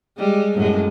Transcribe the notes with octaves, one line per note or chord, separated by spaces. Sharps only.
G3 G#3
F#2 A2 G#3